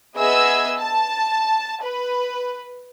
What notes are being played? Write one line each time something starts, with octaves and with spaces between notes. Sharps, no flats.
B3 G#4 D#5 E5 G#5 E6
A5
B4